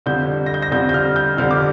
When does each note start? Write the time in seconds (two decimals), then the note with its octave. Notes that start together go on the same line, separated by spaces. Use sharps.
0.06 F2 D3 G3 G6
0.46 A#6
0.54 G6
0.62 A#6
0.71 F2 D3 G3 G6
0.89 G6
0.94 F6
1.16 G6
1.37 F2 D3 G3 F6
1.51 D6